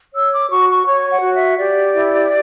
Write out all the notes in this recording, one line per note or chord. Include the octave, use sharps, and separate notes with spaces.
C#5 E6
D6
F#4 C#6
C#6
C#5 C#6
F#5
F#4
E5
G4 D5
E4